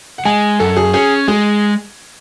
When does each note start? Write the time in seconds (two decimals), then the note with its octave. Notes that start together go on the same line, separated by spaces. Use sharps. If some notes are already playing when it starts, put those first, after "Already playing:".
0.18 F#5
0.25 G#3 G#5
0.60 F#2 A4
0.77 G#4
0.93 C#4 G#4
1.28 G#3 G#4